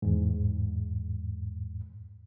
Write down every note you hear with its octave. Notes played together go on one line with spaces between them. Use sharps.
E2 G#2